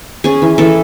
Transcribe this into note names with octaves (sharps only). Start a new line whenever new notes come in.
C#4 G#4
E3
E3 A4